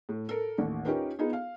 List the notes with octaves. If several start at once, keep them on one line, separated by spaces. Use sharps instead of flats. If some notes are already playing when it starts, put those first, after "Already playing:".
A2
A4 A#4
A1 D#2
C#4 D#4 F4 G4 A#4 B4
B3 D#4 F4 G#4
F5